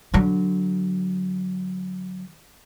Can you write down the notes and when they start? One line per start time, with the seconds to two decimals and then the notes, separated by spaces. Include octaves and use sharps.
0.14 D3 F#3